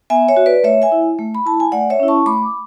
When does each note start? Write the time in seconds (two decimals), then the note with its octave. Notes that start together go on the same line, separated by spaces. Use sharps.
0.10 B3 E5 G#5
0.28 C#5 E5
0.37 F#4
0.46 B4 D5
0.64 A3 C#5 E5
0.82 E5 G#5
0.92 E4
1.19 A3
1.35 B5
1.45 E4 A5
1.60 G#5
1.72 A3 D5 F#5
1.90 C#5 E5
2.00 C#4 E4
2.08 A5 C#6
2.26 A3 B5 D6